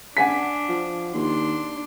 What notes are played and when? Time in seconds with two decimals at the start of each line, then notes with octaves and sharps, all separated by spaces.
0.17 D4 F#5 G#5 B6
0.69 F3
1.14 D#2 D4 C6